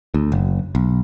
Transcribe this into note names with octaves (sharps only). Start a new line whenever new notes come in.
D2
F#1
B1